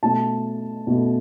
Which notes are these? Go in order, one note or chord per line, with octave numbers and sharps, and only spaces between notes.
B2 A3 A5
B2 A3